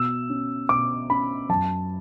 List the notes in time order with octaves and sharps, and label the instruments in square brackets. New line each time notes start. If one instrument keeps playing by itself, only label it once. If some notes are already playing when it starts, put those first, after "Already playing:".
Already playing: [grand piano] B2 E6
C#4
B2 D6
C#4 B5
F#2 A5